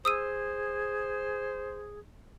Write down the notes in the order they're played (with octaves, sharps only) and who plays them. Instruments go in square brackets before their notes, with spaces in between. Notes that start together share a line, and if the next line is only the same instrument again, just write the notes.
[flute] G#4 [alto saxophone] C5 [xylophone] D#6 E6 D#7